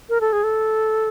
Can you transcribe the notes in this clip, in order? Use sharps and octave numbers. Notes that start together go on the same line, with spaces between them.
A#4
A4
G#4
A4